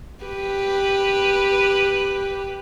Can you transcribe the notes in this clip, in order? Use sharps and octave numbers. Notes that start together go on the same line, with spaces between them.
G4 B4